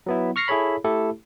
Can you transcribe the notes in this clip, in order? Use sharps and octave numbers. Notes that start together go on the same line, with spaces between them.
F#3 B3 E4
C#6 F6 A#6 C7 C#7
E4 G#4 A4 C#5 B5
A3 E4 G4 A4